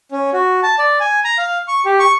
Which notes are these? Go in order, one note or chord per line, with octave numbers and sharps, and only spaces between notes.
C#4
F#4
A5
D5
G#5
A#5
F5
C#6
G4
C#6